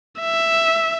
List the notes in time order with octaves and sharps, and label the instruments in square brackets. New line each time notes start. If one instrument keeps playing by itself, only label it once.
[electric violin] E5